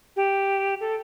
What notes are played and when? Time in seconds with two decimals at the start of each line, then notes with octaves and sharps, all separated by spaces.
0.16 G4
0.80 A4